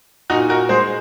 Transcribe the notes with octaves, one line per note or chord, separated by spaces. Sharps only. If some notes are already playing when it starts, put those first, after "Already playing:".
A#2 D#4 F#4
F#4 A#4
G#3 G#4 C5